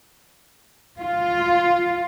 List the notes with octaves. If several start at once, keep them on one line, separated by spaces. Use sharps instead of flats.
F4